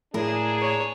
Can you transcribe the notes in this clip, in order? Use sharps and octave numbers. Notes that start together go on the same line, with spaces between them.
A2 A#3 D4 G#4 A#4
C#5